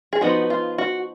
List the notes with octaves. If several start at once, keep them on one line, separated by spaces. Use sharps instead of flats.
G#4
F3 B3 D#4 F#4
F4
F#4